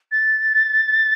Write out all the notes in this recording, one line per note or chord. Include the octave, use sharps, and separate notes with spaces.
A6